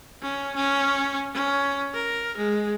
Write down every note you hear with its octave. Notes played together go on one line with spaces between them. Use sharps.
C#4
C#4
C#4
A#4
G#3